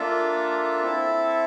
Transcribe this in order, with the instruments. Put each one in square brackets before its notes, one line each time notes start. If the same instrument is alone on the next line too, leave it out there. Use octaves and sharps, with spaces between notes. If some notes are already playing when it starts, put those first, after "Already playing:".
Already playing: [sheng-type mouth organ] A#3 D4 F4 A4 E5
C4 E4 A4